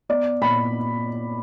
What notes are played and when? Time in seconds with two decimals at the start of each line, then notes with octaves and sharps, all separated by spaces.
0.09 B3 D5
0.41 A#2 B5